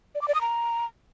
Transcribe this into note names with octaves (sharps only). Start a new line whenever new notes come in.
D5
D6
D5
D#6
A#5